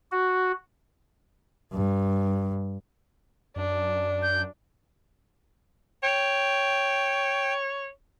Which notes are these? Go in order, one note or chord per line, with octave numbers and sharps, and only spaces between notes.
F#4
G2
F#2 D4
G6
C#5 G5